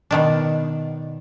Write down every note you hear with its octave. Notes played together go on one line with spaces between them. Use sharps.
B2 D#3 D4